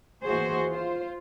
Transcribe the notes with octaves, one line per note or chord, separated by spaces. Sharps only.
D#2 E3 F#4 G#4 C5
F4 C5